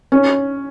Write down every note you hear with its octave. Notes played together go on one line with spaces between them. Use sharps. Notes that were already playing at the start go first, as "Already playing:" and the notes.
C#4